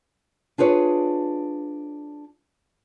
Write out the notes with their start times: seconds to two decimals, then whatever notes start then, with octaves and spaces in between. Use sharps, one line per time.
0.58 D4 F4 G#4 B4 C#5